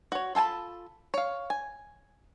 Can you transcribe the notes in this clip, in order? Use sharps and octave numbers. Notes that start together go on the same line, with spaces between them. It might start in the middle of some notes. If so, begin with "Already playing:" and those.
F#4 C#5
F4 A4 G#5 A5 B5
C#5 F5
G#5